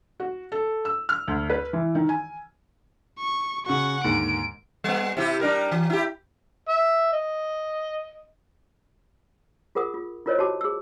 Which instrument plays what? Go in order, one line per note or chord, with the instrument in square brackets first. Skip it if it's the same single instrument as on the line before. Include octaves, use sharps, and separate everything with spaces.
[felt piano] F#4
A4
E6
F6
D2
B4
E3
D#3
G#5
[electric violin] C#6
[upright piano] C#3 F#4 [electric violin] F#5 C#6
[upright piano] D#2 G#2 D3 [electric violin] D7
[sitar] G3 B3
C3 E4 G4
G3 D4 A#4
E3
E4 G4
[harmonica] E5
D#5
[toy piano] F4 G#4 A#4 F#5 D#6
F4
E4 F4 A#4 C5 C#5 D#5
F#4 G4 A5 D6
G#4 E6